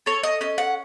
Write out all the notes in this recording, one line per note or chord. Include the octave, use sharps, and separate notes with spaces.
A4 C#5
D#5
C#4 D#5
F#5